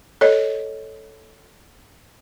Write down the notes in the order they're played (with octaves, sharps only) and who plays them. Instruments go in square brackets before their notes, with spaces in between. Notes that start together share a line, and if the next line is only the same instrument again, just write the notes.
[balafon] A4 C#5 D#5